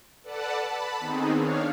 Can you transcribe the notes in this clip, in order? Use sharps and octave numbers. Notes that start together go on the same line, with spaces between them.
A4 B4 D5 F#5 A5
A5 B5
D#3 B3 C4 D#4 G#4
D4 C#5 F5